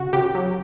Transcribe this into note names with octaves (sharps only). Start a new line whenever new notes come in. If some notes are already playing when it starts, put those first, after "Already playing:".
Already playing: C#3 F#4
C#3 G4
F#3